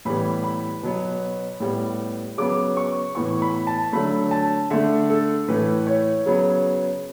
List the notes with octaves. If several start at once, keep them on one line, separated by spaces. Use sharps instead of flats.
A2 E3 G3 B3 B5
B5
B2 F#3 B3
A2 G3 B3
C#3 F#3 B3 D6
C#6
A2 E3 B3 C#6
B5
A5
D3 F#3 A3 B5
A5
D3 A3 E5
A4
A2 E3 A3 B4
C#5
C#3 F#3 B3